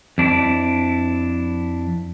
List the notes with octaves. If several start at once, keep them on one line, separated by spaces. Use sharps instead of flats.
F2 D4 E4